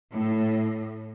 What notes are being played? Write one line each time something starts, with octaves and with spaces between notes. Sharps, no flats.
A2